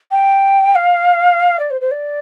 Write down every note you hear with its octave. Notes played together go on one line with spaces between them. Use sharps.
G5
F5
D5
C5
C5
D5